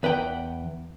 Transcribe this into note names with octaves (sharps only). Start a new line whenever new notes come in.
E2 B4 F#5 G5